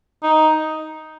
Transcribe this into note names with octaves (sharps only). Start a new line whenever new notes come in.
D#4